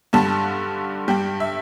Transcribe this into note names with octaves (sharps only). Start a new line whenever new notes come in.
G2 D3 G3 A5
G2 G3 G5
E5